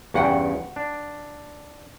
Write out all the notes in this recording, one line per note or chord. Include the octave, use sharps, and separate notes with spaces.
E2 G2 C#3 F#4 F#5 G5
D4